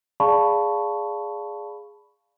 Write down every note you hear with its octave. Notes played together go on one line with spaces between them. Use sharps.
G#4 D5 F5 A5 B5 C#6